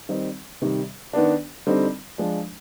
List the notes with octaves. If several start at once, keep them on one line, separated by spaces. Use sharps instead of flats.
D#3 G3 C4 D#4
C3 D#3 G3
D#3 B3 D4
D3 G3 C4 D#4
F3 G#3 D4